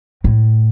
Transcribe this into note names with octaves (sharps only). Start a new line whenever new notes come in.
A2